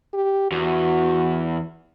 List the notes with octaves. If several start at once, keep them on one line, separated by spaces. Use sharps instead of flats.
G4
E2 F#4